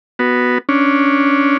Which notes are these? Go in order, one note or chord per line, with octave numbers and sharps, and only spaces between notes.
B3 F#4
C#4 D4